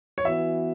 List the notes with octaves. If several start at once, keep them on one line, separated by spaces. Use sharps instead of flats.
C#5
E3 B3 F#4 E5